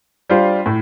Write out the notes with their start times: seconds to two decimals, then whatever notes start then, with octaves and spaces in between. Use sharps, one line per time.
0.29 G3 D4 F4 C5
0.66 A2